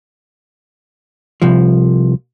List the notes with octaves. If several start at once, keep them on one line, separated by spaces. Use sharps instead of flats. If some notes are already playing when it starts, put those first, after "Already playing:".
C2 F3